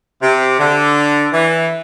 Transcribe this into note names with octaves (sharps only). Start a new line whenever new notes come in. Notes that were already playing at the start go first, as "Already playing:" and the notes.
C3
D3
E3